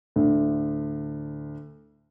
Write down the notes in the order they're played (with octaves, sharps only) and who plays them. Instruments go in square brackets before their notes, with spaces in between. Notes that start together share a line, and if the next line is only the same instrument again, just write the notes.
[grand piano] D2 A2 D3